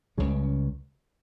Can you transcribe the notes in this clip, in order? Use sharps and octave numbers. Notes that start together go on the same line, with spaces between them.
C#2 C#3 G3